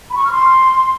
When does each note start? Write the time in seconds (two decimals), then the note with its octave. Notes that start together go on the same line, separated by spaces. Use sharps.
0.11 B5
0.18 C#6
0.24 F6
0.31 C6